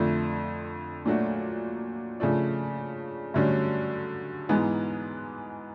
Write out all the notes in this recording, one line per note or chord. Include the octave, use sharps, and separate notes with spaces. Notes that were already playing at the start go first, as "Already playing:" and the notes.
Already playing: F2 D3 F3 A3
A#2 F#3 A3 D4 F#4
C#3 F3 A3 D4
G2 D3 F#3 A3 C#4
G#2 E3 G#3 B3 D#4